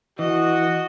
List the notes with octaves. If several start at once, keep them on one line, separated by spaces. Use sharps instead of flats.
E3 F#4 D#5